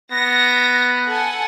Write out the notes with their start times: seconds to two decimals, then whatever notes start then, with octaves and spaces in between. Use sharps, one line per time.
0.12 B3 A#6
1.08 A4 F#5 G#5